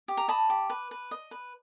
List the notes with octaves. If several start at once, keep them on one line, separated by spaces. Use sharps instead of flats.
G4
A#5
D#5 A5 B5
G4
B4
B4
D#5
B4